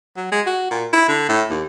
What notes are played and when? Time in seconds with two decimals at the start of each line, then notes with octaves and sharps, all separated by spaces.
0.16 F#3
0.32 G#3
0.47 F#4
0.71 A#2
0.93 E4
1.08 D3
1.29 A2
1.50 D#2